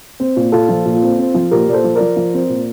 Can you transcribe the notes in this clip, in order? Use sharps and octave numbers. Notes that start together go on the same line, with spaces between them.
C4
A#2
A#2 F4 A4
F3
A#2
C4
C4
F3
A#2 G4 A#4
A#2 D5
A4 C5
F3
A#4 D5
F3
F3
C4
A#2